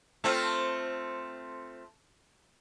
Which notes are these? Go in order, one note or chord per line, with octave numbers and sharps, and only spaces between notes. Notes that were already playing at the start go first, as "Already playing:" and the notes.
A3 C4 F4